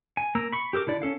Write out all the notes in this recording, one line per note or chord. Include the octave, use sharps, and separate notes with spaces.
G#5
A#3 A#5 E6
B5 C#6
G4 A4 A#4 D6
D3 E4 D5
C#4 A4 F5